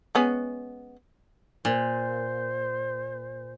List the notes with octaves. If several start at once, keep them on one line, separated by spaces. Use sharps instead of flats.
G#3 B3 C#4
A#2 C5